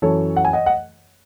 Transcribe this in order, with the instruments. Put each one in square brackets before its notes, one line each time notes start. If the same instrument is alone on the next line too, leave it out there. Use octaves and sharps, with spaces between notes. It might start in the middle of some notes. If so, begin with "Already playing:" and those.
[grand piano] F#2 E3 A4 C#5
F#5
G#5
D#5 F#5
F#5